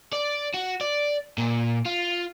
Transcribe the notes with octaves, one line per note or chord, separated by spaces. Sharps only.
D5
F#4
D5
A#2
F4